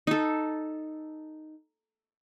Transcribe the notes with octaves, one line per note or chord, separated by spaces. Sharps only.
D#4 A4